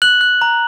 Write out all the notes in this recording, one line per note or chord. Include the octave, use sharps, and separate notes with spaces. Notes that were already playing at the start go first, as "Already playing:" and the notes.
F#6 F#7
F#6
A#5